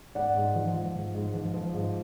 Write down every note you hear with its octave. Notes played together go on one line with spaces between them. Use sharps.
G#2 D5 F#5
G#2
F3
F3
G#2
G#2
F3
F3
G#2